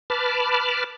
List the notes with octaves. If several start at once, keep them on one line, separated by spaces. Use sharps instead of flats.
B4 A5 B5 D6 F6